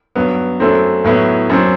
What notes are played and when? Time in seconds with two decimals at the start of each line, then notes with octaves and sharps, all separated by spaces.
0.15 G2 F#3 B3
0.60 F#2 F#3 A3 C4
1.04 A2 F#3 B3 E4
1.50 F#2 F#3 C4